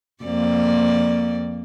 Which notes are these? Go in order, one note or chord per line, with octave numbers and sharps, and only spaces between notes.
F2 A#3 D5